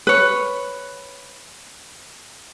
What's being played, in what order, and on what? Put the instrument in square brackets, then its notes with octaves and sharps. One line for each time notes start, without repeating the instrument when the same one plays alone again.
[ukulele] B4 C#5